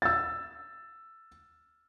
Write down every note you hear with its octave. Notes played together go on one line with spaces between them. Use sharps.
E6 A6